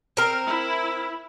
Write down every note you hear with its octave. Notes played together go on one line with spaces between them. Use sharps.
C4 A#4
E4